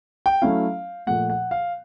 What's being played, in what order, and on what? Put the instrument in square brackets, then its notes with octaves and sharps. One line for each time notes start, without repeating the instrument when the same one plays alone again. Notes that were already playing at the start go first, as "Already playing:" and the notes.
[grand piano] G5
F#3 A3 C#4 E4 F5
A#2 F3 A3 F#5
F#5
F5